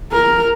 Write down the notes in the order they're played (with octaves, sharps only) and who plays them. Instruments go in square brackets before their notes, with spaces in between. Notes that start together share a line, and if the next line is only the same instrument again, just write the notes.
[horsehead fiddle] A#4